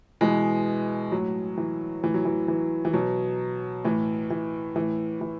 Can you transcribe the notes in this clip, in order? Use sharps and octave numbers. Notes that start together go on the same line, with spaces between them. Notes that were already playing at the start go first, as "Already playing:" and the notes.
B2 E3 G#3
A2 F#3
E3
A2 E3
F#3
E3
E3
E3
B2 F#3
A2 E3
E3
A2 E3
E3